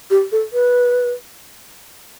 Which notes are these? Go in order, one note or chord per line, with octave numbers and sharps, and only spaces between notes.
G4
A4
B4